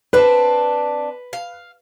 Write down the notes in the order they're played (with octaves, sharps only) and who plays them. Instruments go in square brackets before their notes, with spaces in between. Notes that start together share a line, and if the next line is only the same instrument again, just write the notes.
[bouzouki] C4 D4 [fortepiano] B4
[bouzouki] F5